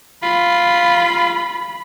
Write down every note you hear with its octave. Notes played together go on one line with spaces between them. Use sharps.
F4 B5